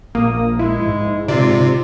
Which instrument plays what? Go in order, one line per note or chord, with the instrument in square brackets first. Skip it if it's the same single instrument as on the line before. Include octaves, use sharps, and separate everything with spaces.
[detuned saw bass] A#1 [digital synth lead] A#3 [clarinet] D#6
[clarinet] G#3 [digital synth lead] E4
[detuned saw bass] G#2
[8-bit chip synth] C3 [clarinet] F4 [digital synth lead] D5